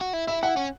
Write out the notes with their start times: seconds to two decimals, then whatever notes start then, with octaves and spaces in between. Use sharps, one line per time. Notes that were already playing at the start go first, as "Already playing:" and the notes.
0.01 F#4
0.13 E4
0.27 E4 E5
0.43 E4 F#5
0.57 C#4